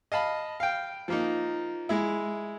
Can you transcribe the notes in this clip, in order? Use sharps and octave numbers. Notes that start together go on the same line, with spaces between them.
D#5 F5 A5 B5
F5 G5
F3 A#3 D#4
G#3 E4